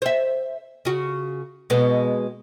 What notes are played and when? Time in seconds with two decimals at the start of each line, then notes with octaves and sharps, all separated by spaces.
0.02 C5 E5
0.85 C#3 F#4
1.70 B2 G#3 B3